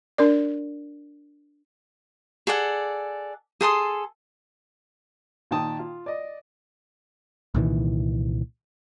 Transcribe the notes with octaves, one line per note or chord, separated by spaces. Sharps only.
D4 A#4 D5
G#4 A4 D5 F#5
G#4 A4 C6 D#6
A#2 D#3 G5 A5 D#6
F4
D5 D#5
C2 A#2 D#3 E3